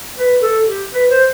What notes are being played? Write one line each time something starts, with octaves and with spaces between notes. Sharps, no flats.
B4
A4
G4
B4
C5